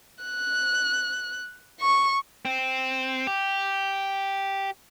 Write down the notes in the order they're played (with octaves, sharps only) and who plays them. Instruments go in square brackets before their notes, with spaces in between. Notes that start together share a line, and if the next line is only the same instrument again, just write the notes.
[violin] F#6
C#6
[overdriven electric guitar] C4
G4